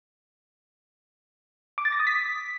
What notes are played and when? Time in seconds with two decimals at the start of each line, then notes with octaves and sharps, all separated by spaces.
1.78 D6
1.85 A6
1.92 A#6
2.00 D#6
2.07 B6